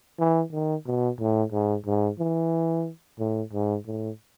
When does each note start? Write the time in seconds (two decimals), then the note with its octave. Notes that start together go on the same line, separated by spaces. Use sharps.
0.19 E3
0.52 D#3
0.86 B2
1.20 A2
1.52 G#2
1.86 G#2
2.19 E3
3.19 A2
3.53 G#2
3.87 A2